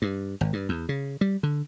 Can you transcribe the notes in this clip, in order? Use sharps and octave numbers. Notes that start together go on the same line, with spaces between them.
G2
G#1
G2
E2
C#3
G3
D3